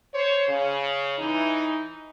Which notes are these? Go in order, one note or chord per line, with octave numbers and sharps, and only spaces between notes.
C5 C#5
C#3
E3 D#4